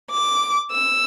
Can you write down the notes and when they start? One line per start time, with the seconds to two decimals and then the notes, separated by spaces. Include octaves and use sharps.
0.11 D6
0.72 E6